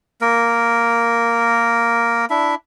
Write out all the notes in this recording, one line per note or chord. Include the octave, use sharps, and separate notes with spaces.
A#3 A#4
D4 E4 E5